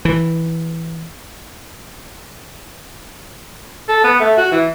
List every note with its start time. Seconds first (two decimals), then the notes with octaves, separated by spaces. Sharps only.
0.05 E3
3.89 A4
4.04 B3
4.20 A3
4.37 F#4
4.52 E3